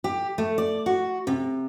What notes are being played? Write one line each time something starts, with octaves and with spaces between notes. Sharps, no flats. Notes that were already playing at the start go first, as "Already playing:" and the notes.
G4
A3
D5
F#4
C3